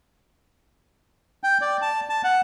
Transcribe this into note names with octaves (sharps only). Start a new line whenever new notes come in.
G5
D5
A5
A5
F#5